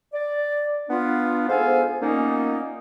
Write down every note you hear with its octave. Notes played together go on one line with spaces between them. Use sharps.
D5
B3 D4 F4
G#2 B3 A4 C5 F5 G#5
A#2 A#3 B3 C#4 D#4